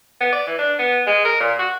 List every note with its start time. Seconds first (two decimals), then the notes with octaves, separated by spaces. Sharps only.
0.20 B3
0.32 D5
0.47 E3
0.58 D4
0.79 B3
1.06 G#3
1.25 A#4
1.40 A#2
1.59 F#4